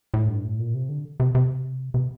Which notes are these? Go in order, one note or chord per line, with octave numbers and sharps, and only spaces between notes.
A2
G2
A2
A#2
C3
D3
C3
C3
C3